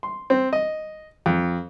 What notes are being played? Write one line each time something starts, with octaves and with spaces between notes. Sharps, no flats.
C6
C4
D#5
F2